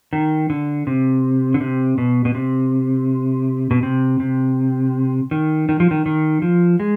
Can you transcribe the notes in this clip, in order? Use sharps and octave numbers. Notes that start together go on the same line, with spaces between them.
D#3
D3
C3
D3
C3
B2
B2
C3
B2
C3
C3
D#3
D#3
F3
D#3
D#3
F3
G#3